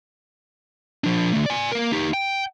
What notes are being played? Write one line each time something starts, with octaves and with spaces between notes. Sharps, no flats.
F3 D4
D3 A3
D5 G#5
A#3 A#4
D#4 G4
G5